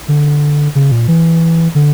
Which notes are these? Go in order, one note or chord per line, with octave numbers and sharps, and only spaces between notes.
D3
C#3
A#2
E3
D3